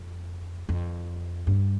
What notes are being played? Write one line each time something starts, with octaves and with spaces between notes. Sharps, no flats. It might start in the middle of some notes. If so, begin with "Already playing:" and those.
Already playing: F2
F2
G2